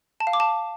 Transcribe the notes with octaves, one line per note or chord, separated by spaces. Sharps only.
A5
F5
D6
A5